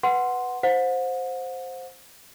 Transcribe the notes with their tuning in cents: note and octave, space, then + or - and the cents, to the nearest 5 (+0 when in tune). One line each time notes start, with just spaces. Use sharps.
B4 +0 F#5 +0 C6 +0
C5 +0 F#5 -40